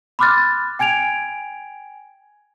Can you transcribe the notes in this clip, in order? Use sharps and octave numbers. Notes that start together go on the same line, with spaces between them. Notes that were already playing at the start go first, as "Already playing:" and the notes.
B5 C6 D6 F6 F#6 A6
G5 G#5 G#6 D7 F7